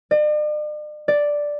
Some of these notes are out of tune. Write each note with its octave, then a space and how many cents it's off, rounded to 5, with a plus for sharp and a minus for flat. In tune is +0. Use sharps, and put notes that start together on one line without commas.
D5 +45
D5 +0